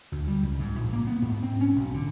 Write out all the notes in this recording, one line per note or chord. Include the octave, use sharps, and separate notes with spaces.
D2
G3
C#2
G#2
A#1
A#3
B3
G#2
C4
C#4
B1
D3